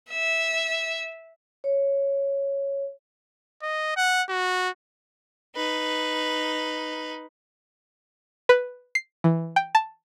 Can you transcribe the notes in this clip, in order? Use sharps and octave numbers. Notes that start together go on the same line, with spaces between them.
E5
C#5
D#5
F#5
F#4
D#4 B4
B4
C7
E3
G5
A5